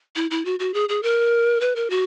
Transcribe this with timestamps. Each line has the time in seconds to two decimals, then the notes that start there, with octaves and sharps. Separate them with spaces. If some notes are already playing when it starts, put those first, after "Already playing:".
0.16 E4
0.31 E4
0.45 F#4
0.59 F#4
0.74 G#4
0.89 G#4
1.03 A#4
1.61 B4
1.76 A#4
1.90 F#4